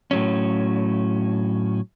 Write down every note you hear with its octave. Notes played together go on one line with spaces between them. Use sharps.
A2 F#3 C#4